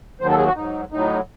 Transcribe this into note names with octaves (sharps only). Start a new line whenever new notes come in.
D#2 D#3 F#3 C5
A4
G#4
F#4
G#2 F#3 D#4
A2 F#3 D#4